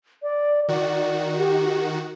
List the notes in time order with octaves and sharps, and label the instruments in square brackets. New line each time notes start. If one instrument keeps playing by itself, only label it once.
[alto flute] D5
[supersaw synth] D#3 F#4 [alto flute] D5
[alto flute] G4